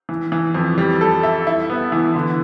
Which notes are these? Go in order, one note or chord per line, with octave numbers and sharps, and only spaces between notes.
E3
E3
F2
G3
A4
E5
E4
B3
E3
D3